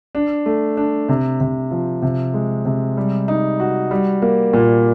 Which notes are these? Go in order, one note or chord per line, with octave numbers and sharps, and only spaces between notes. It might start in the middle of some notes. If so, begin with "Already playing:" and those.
D4
A3
D4
C3
C3
F3
C3
G#3
C3
G3
D#4
F#4
G3
A#3
A#2